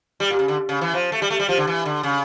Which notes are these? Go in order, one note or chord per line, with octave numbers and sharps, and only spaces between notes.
G3
A#2
C#3
D3
C#3
E3
F3
A3
G3
A3
G3
F3
D3
E3
D3
C#3